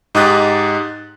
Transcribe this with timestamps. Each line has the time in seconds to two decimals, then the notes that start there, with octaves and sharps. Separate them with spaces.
0.15 G#2 D#4 G4 D#6 F#6 A6